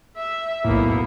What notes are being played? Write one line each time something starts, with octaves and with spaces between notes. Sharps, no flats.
E5
B1 E2 A2 A#3 B3